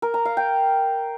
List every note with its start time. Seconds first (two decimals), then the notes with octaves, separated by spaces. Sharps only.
0.02 A#4
0.14 A#5
0.25 F5
0.37 G5